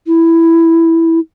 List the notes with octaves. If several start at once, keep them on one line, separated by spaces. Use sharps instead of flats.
E4